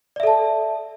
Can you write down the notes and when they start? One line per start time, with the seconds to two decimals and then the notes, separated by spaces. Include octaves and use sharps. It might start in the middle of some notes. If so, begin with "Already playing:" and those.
0.16 D5
0.20 E5
0.23 A4
0.27 A5